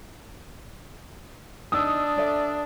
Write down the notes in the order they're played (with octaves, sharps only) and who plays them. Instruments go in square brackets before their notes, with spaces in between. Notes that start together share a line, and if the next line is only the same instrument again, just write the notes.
[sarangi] D4 [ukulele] D#4 [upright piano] D#6 E6
[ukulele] A4 D5 E5